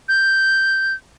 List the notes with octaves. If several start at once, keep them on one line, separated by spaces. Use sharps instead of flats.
G6